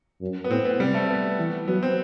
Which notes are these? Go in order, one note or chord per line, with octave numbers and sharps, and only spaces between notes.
F#2
B3
A2 C4
B3
C3 G3
A3
B3
E3
F#3 B3
C4